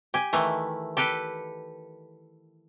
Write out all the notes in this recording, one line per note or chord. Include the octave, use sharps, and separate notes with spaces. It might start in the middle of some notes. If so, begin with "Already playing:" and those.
G4 G#5
D#3 E3 A3
G4 A4 B4 G5